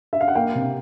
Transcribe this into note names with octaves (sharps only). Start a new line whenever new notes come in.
E5
F5
F#5
A#3 F5 G5
C3